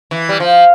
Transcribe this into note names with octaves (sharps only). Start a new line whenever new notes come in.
E3
G3
F3